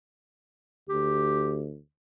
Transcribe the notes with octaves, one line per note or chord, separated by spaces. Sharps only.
D2 G4